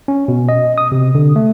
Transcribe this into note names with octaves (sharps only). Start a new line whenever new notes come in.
C#4
B2
D#5
D#6
C3
D3
A3